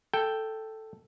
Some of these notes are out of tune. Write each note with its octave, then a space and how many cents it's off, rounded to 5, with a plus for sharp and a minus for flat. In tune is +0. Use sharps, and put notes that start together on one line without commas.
A4 +0 G5 +0